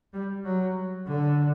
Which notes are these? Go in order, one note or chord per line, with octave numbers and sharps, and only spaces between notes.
G3
F#3
D3